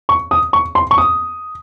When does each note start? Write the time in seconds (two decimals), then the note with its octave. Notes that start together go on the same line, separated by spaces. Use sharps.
0.09 C#6
0.31 D#6
0.53 C#6
0.75 C6
0.91 C#6
0.98 D#6